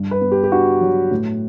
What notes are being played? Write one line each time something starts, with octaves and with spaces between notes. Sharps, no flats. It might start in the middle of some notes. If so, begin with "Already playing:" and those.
Already playing: G2
B4
B3
G4
G4
D4 F#4
F#3
A2